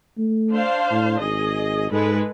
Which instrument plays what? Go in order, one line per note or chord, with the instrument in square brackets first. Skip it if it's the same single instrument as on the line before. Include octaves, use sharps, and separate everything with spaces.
[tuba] A3
[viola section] D4 C5 F5
[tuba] A2
[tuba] G#1 [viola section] G#4 D#5
[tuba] G#2 [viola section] G#3 A4 B4